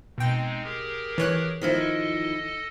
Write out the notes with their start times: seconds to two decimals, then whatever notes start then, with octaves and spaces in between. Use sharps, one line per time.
0.18 B2 G#3 C4 D#4 G5
0.63 G4 G#4 A#4
1.18 E3 C#5 F#6
1.61 D#3 F3 E4 A4 D#5